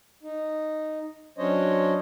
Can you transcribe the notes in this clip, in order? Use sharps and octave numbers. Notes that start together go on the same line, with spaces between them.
D#4
F#3 C#4 D4 C5 C#5 D#5